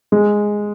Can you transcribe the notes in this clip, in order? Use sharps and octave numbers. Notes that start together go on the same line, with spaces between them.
G#3